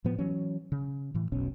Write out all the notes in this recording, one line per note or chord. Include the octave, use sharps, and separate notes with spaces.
A2 F3 B3
E3 F#3 C#4
C#3
A2 E3
F1 B1 B2 C#4